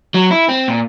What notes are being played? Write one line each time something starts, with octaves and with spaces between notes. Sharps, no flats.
F#3
E4
C4
A#2